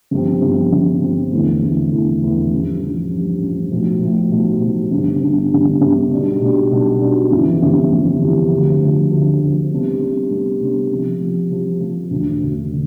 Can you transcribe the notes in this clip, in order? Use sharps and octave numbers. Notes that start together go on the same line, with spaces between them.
G1 G2 F3 C4
G1 G2 F3 C4
G1 G2 F3 C4
G1 G2 F3 C4
F1 E2 D3 A3 E4
F1 E2 D3 A3 E4
F1 E2 D3 A3 E4
F1 E2 D3 A3 E4
A1 G2 F3
A1 G2 F3
A1 G2 F3
A1 G2 F3
B1 A2 F3
B1 A2 F3
B1 A2 F3
B1 A2 F3
G1 G2 D3
G1 G2 D3
G1 G2 D3
G1 G2 D3
B1 B2 G3 D4
B1 B2 G3 D4
B1 B2 G3 D4
B1 B2 G3 D4
G1 F2 C3 E3
G1 F2 C3 E3
G1 F2 C3 E3
G1 F2 C3 E3
D2 C3 F3
D2 C3 F3
D2 C3 F3
D2 C3 F3
C2 C3 G3 B3 D4
C2 C3 G3 B3 D4
C2 C3 G3 B3 D4
C2 C3 G3 B3 D4
C2 C3 F3
C2 C3 F3
C2 C3 F3
C2 C3 F3
E1 D2 D3
E1 D2 D3
D3